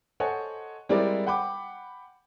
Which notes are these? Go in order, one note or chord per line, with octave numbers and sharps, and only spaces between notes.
A4 C5 C#5 D#5 F#5 G#5
G3 G#3 C4 E4 A#4 D5
F#5 G5 B5 D6